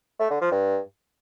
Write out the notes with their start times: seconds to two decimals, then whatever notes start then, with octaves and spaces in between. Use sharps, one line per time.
0.20 A3
0.30 D3
0.41 F3
0.52 G2